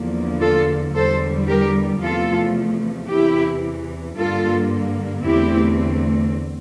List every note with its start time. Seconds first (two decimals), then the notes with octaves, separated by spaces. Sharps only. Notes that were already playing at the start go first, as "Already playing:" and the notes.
Already playing: E2 D3 F3 A#3
0.40 F4 A4
0.94 E2 D3 G3 A4 C5
1.48 G4 A#4
2.01 E2 C3 F3 A3 F4 A4
3.09 E2 C3 E3 E4 G4
4.17 G2 D3 G3 A#3 F4 A4
5.24 E2 D3 A3 C4 E4 G4